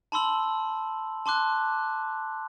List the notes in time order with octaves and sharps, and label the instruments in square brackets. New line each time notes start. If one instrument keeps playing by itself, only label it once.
[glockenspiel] A5 B5 C6 E6 F#7
A5 C6 D6 F#6